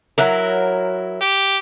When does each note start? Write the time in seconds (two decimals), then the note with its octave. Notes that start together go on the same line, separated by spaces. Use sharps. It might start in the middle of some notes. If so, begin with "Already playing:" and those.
0.18 F#3 E4 A#4
1.21 G4